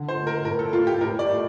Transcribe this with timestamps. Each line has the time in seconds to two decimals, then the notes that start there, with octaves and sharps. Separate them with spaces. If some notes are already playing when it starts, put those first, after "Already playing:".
Already playing: D3
0.09 C5
0.17 A3
0.27 A#4
0.45 A2 A#4
0.59 A4
0.73 A3 F4
0.87 G4
1.01 A2 A#4
1.19 D5
1.29 A3